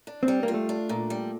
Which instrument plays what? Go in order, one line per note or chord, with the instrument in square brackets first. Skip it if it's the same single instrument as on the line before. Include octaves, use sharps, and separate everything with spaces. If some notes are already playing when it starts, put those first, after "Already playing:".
[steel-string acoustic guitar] D4
[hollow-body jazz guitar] C4
[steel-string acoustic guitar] G3
[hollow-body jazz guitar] A#3
[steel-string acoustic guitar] F4
[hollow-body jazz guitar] A3
[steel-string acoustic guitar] D4
A#2
G3